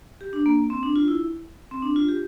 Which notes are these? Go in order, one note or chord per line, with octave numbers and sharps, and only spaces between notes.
G4
D4
A#3
C4
D4
F4
E4
C4
D4
F4
G4